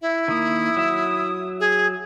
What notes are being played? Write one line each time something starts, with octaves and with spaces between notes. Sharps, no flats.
E4 E5
D#3 A#3 D#6
F#3 E5
G#4